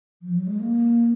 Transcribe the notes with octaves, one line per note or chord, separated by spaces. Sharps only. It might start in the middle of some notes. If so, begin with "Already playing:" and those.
F3
F#3
G#3
A#3